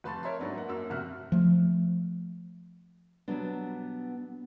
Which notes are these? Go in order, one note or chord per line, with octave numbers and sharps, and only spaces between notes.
F1 B4 A5 C6 C#6 A6
A#4 C#5 E5 A#5 C6
G#2 F#3 B3 D4
A#3 F#5
F#2 A#3 E6
F1 C3 F#4 E5 F6 F#6
F3 A3
B2 F#3 G3 B3 D4